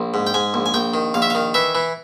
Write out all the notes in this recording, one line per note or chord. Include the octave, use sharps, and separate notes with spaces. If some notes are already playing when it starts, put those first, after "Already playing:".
Already playing: A#1
G#2
G5
G#2 G#5
A#1
G#5
A#1 G5
D#3
A#1 F5
E5
D#3 F5
E3 E5
E3